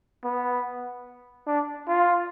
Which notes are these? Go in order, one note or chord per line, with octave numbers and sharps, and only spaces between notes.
B3
D4
F4